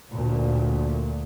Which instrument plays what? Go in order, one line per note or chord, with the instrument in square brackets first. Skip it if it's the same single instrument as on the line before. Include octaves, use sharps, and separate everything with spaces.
[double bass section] D2 A#2